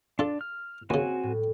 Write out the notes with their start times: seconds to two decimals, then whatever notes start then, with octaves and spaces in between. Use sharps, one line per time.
0.19 D4 F4 A4
0.41 F6
0.90 D#2 C#3 C4 F#4 G#5
1.23 A2 G3